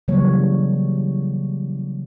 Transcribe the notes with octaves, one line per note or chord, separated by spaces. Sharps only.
C#3 E3 F#3 G3 A#3 C#5